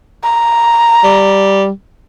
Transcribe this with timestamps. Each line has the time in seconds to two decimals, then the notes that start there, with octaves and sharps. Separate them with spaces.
0.24 A#5
1.04 G3